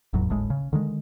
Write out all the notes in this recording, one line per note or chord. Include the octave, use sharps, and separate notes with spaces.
F1 E2 A2 F#3
D1 G#1 A2 G#3
C#3
D3 D#3 G#3